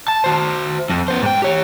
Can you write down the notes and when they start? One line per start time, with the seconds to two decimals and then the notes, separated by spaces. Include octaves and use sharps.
0.08 A5
0.24 F#4 C5
0.90 F2
1.08 B3 C5
1.22 G#2 G5
1.42 G4 C#5